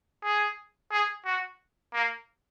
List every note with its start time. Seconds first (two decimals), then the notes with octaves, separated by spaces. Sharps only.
0.24 G#4
0.92 G#4
1.25 F#4
1.94 A#3